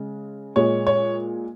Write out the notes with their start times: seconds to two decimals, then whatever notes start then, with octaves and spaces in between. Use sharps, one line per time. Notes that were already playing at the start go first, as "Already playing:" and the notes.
Already playing: C#3 G#3
0.56 A#2 G#3 C#5
0.87 C#5